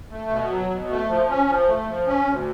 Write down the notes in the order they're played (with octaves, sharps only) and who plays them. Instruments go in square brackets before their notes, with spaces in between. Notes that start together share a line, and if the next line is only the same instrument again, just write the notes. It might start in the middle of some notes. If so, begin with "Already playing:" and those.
[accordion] A3
B2
F#3
B2
A3
F3
C#4
F3
A3
F3
C#4
D2